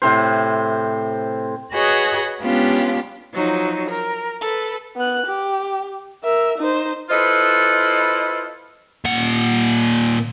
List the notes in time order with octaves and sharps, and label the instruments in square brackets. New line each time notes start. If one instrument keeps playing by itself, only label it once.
[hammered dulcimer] A2 C3 C5
[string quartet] F#4 G#4 B4 C#5 D#5 F#5
G#3 B3 C#4 D4 F4 G4
F3 F#3 D#4
A#4
A4 B4
[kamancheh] B3 F#6
G4
A#4 E5
D#4 C5
[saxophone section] E4 F4 A4 B4 C5 D#5
[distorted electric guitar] A#2 F#5